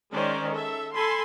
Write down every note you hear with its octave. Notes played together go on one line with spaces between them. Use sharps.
D#3 G#3 C#4 C5 D5
A4 E5
A4 G#5 B5 C6